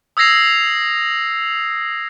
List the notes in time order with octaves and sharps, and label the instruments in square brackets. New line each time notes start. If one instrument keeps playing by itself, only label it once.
[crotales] D#6 E6 G#6 A#6 C7 F7